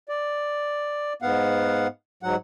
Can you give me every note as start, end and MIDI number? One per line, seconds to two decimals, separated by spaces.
0.09 1.13 74
1.22 1.87 44
1.22 1.87 59
1.22 1.87 77
1.22 1.87 78
2.23 2.36 44
2.23 2.36 54
2.23 2.36 78